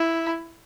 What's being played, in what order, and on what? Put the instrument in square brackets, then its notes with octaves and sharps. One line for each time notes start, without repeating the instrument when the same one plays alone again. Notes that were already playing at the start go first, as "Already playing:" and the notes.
Already playing: [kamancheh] E4